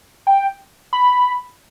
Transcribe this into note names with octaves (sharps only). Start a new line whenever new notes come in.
G5
B5